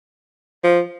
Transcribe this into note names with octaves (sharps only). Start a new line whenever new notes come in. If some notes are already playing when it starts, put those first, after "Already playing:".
F3